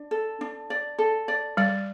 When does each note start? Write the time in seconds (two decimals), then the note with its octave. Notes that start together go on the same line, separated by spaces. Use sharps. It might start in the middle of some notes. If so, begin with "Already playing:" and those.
Already playing: D4
0.11 A4
0.41 D4
0.70 D5
0.98 A4
1.28 D5
1.57 G3 D5